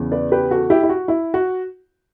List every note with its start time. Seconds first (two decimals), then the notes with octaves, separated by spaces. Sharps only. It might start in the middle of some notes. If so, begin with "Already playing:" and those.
Already playing: E2 C#3 E3 B3
0.12 B4 D5
0.32 G4 B4
0.51 F#4 A4
0.70 E4 G4
0.83 E4
0.89 F#4
1.08 E4
1.34 F#4